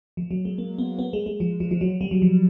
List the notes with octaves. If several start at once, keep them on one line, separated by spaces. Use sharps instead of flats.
F3
F#3
G#3
A#3
B3
B3
G#3
G#3
F3
F3
F3
F#3
G3
F#3
F3